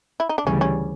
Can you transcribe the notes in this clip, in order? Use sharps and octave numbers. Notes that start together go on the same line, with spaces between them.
E4
D#4
D4
D2 C#3 E3 G3 C#4
C#4